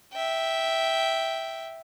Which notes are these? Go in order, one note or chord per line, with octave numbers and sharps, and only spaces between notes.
E5 G5